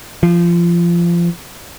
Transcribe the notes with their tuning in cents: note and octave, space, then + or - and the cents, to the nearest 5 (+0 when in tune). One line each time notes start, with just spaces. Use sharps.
F3 -25